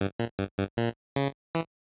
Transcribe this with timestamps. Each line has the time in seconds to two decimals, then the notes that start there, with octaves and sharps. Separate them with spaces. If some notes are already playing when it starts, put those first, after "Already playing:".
0.01 G2
0.19 A#2
0.39 G2
0.58 G2
0.77 A#2
1.16 C#3
1.55 E3